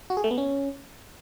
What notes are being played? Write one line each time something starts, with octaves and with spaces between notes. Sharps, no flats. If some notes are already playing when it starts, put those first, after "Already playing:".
F#4
G#4
A3
B3
C#4